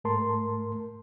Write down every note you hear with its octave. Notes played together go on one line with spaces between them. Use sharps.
G#2 A3 A#4 A5 C6